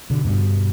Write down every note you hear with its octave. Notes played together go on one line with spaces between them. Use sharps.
B2 D3
G2 B2